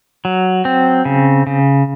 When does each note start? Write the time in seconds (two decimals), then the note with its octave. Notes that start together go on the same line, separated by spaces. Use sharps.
0.25 F#3
0.65 C4
1.05 C#3
1.47 C#3